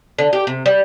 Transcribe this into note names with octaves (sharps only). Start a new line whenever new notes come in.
D3
G4
C3
G3